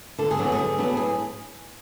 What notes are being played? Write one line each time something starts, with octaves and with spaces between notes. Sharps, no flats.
D3 A4
G#4
F#3 B3 D4 F#4
G#4
D3
F#3 B3 D4
A2 G#4